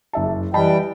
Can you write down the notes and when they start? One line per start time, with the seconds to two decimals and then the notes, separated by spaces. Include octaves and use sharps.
0.13 F#1 E5 A5
0.54 E3 G3 D#5 G5 A5 B5